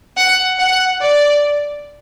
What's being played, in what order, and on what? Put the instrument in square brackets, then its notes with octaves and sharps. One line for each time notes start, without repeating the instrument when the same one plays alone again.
[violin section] F#5
F#5
D5